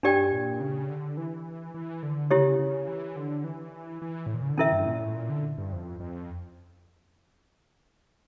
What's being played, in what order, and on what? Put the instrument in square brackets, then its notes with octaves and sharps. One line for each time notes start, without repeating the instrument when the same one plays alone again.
[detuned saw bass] G2 [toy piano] D4 G4 D5 G5
[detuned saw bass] A#2
C#3
D3
E3
E3
D3
[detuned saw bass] C#3 [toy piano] E4 G4 C#5
[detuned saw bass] C#3
E3
D3
E3
E3
A2
A#2
C#3
D3
[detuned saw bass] E3 [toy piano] C#4 E4 A#4 E5
[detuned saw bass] G2
A#2
A2
A#2
D3
G2
F2
F2